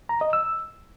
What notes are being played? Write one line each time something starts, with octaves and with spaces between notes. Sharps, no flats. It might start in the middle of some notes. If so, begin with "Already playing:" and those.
A#5
D#5
E6